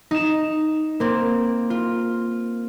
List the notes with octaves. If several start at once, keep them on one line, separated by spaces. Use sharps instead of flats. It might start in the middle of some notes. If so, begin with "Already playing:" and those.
D#4 E7
A#3 C4
F4